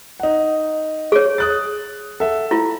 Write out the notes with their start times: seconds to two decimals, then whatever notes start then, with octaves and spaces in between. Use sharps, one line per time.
0.20 D#4 F#5
1.12 G#4 C#5
1.38 D#6 F#6 A6
2.20 A4 E5 F#5
2.51 E4 F4